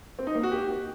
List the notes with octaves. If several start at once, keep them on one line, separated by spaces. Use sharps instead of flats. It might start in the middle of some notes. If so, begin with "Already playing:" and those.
C4
D#4
A#3
F#4
G4